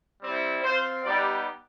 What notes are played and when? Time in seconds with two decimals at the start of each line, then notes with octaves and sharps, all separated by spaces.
0.22 G3 C4 E4
0.63 C4 F4 C5
1.04 G3 B3 D#4 G4 D5